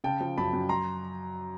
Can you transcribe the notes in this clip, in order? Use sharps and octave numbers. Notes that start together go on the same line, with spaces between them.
C#3 G5 A5
F3
F#2 A5 B5
F#2
F#3 A#5 C6